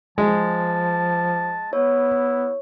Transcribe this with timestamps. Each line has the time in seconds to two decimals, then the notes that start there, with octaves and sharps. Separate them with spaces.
0.18 F3 G#3 A5
1.73 B3 E4 C#5